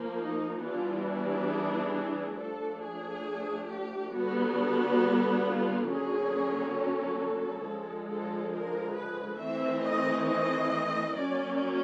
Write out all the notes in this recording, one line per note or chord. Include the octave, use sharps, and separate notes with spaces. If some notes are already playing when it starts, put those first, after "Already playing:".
Already playing: F3 A#3
D#4
E3 G3 B3 D4 F4
F#4
G#4
G#4
F3 A3 D4 A4
G#4
G4
D3 G3 B3 F#4
F4
D3 F#3 A#3 C#4 G#4
A4
D3 F3 G#3
A4
A#4
B4
E3 A3 C4 E5
D#5
D#5
F#3 A#3 C#4 D5